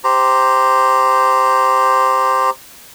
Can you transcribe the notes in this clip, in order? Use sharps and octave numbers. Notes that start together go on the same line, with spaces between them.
G4 C5 A#5